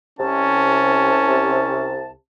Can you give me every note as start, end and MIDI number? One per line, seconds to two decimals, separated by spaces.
0.19 2.10 36
0.19 2.10 48
0.19 1.93 61
0.19 2.10 81